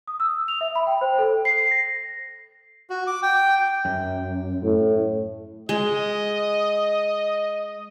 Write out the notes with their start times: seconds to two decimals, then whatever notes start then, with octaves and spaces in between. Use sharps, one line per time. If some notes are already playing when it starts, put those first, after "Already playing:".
0.07 D#6
0.20 E6
0.48 F7
0.61 E5
0.75 B5
0.87 G5
1.01 C5
1.18 A4
1.45 C7
1.71 A#6
2.90 F#4
3.07 D6
3.23 G5
3.85 F#2
4.63 A2
5.69 G#3 D#5